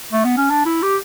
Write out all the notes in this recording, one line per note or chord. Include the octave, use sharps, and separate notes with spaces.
A3
B3
C#4
D4
E4
G4